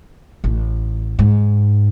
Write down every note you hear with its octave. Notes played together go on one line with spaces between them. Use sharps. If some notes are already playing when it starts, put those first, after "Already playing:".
A1
G#2